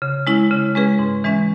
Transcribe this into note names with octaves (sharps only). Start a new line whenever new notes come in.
C#3
G#3 C#4 E4
C#3
G#3 C#4 G#4 B4
G#2
E3 G#3 C#4